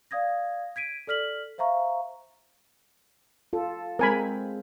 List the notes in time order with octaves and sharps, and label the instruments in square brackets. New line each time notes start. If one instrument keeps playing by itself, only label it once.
[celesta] D5 F5 D#6 G#6 A#6
G#6 B6 D7 D#7
A4 D5 F6 B6 F#7
C5 E5 F5 A#5 C#6
[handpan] F4 A4
[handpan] G#3 C4 [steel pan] A#4 G#5 B5